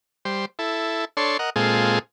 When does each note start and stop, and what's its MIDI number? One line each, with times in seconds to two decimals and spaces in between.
0.25 0.45 55
0.25 0.45 72
0.59 1.05 64
0.59 1.05 69
1.17 1.37 62
1.17 1.37 69
1.17 1.37 73
1.17 1.37 84
1.39 1.50 70
1.39 1.50 75
1.39 1.50 78
1.56 1.99 46
1.56 1.99 56
1.56 1.99 60
1.56 1.99 65
1.56 1.99 68
1.56 1.99 69